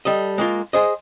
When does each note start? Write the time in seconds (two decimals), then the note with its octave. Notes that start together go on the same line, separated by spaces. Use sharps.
0.05 G3 A4 D#5
0.38 G#3 A#3 F4
0.73 G#4 C5 D#5